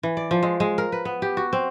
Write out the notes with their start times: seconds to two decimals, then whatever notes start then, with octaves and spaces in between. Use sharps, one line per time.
0.03 E3
0.17 D5
0.31 F3
0.43 G#3
0.60 G#3
0.78 A#4
0.92 B4
1.05 B3
1.22 G4
1.37 F#4
1.53 C4